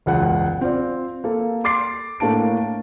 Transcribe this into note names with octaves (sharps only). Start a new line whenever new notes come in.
E1 C#2 F#2 F#5
C4 F4 D5
A#3 A4
C6 D6 A6 C7
A2 A3 A#3 D4 A5 D7